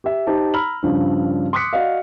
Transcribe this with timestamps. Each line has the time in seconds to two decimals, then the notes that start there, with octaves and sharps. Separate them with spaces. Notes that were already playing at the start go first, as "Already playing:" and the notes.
0.04 G4 E5
0.27 D#4 G4 C5 A5
0.54 A#5 B5 E6 F6 F#7
0.83 G2 C#3 F3 D4
1.53 C6 D6 D#6 F#6 B6 C#7
1.73 F#4 D5 D#5 F5